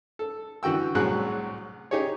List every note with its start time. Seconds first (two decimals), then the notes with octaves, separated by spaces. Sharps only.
0.19 A4
0.63 D3 E3 F#4 G5 E6
0.95 C2 A2 F#3 G#4 F#5 F#6
1.91 D#4 G4 G#4 C#5